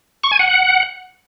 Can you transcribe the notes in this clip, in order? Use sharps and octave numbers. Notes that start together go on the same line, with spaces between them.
C#6
G#5
F#5